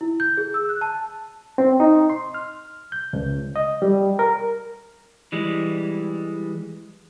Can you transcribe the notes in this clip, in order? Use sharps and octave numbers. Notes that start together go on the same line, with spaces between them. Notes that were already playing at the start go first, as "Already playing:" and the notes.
E4
G6
G#4
E6
F#6
A5
C4
D#4
C6
F6
G6
C#2
D#5
G3
A#4
E3 G3 G#3